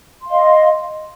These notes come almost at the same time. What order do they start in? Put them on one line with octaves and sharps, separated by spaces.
C6 F5 D#5